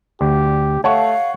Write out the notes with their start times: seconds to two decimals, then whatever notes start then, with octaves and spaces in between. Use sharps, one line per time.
0.21 D2 G4
0.84 A3 C#5 F5 F#5 A5 C#6